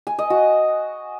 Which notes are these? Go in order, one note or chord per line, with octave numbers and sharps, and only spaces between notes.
G#5
D#5
F#4